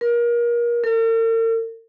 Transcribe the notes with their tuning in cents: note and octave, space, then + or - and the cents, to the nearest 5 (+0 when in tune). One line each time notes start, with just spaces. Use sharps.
A#4 +30
A#4 -45